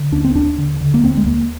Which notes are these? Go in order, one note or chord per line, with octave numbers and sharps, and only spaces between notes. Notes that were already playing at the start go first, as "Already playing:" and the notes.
Already playing: D3
D#2 D4
C4
D#2 D4
D3
D3
A#3
D#2 C4
G#3
D#2 A#3